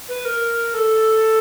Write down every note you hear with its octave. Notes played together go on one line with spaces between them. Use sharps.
B4
A#4
A4